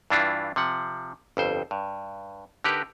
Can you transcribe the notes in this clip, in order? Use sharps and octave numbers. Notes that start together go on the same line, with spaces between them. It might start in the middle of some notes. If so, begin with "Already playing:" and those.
G2 E3 D4 E4 F4
C3 F3 F#5
G1 F2 C5
G2
D3 D#4 G4 A#4 B4